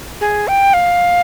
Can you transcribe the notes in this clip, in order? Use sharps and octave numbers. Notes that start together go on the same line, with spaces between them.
G#4
G5
F5